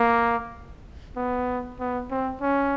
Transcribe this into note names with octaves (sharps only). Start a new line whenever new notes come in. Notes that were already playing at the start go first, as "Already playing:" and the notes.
Already playing: A#3
B3
B3
C4
C#4